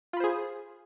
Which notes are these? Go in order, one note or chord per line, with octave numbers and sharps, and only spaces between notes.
F4 G#4 C5 B5